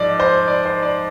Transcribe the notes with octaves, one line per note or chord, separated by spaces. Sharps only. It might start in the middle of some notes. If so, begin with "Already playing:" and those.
Already playing: G#2 F3 D5
C5
D5
C5
D5